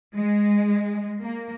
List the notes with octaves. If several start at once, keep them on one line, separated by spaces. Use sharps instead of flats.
G#3
A#3